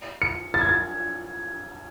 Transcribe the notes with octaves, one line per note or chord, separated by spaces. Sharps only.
C#7
A6
G#6
A6